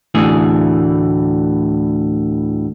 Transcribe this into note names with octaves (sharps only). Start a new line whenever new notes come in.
D2 A2 E3 G#4